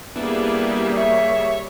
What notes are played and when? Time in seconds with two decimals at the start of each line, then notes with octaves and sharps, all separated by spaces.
0.16 G3 A#3 B3 D4 E4 G#4
0.96 C#5 E5